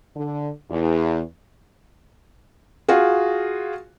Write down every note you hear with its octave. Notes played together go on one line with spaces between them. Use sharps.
D3
E2
F4 F#4 G#4